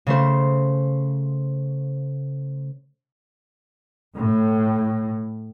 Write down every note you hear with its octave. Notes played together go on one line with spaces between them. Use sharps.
C#3 A3 C5
A2